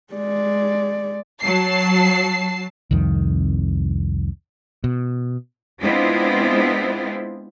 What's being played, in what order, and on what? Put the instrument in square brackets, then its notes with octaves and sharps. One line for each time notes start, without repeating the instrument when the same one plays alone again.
[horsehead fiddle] G#3 D5
[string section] F#3 A5 C7
[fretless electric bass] C2 F2 D#3
B2
[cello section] G#3 B3 C4 D4 E4 F4